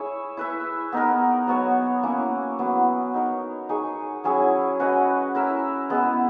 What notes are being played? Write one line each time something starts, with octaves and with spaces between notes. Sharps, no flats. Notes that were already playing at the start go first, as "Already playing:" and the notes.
Already playing: E4 G#4 C#5 E5
E4 B4 E5
B3 D#4 A#4
F#3 B3 F#4 C#5
A#3 C#4 E4
F#3 B3 E4
D#4 A#4 C#5
D#4 G#4 C#5
F#3 C#4 E4 G#4
C#4 F#4 B4 D#5
E4 A#4 E5
G#3 B3 E4